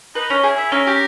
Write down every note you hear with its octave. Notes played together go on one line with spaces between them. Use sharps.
D#4 B4
C#4
E4 G#4
E5
C#4 A#4
G4